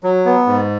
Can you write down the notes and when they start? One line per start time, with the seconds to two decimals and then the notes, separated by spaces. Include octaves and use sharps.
0.03 F#3
0.25 B3
0.47 G#2